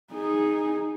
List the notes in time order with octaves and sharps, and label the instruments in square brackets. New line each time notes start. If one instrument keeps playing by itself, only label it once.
[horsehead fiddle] D#4 G#4